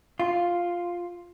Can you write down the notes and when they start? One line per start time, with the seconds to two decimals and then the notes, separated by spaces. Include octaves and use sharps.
0.20 F4